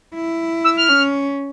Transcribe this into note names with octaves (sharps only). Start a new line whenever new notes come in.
E4
E6
F6
C#4